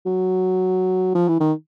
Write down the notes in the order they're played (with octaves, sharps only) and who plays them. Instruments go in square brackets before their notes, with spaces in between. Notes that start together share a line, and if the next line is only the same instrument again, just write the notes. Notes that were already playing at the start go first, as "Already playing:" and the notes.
[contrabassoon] F#3
F3
E3
D#3